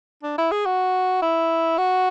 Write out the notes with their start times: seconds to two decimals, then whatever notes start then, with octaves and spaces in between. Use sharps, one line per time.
0.23 D4
0.38 E4
0.51 G#4
0.66 F#4
1.22 E4
1.78 F#4